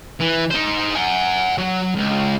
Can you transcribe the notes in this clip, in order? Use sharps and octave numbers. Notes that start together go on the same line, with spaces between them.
E3
D#4 C5
F#5 G#5
F#3
C#2